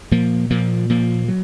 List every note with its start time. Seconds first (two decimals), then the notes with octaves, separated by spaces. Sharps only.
0.11 A#2 F3 A#3
0.50 A#2 F3 A#3
0.90 A#2 F3 A#3
1.28 F#3